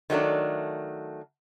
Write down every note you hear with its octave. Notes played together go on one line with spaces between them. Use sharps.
D#3 F#3 A3 D4